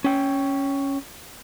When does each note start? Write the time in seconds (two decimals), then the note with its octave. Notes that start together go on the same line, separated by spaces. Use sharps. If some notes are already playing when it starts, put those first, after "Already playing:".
0.04 C#4 G5